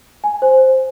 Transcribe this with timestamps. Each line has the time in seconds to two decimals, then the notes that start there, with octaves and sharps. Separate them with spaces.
0.24 G#5
0.42 C5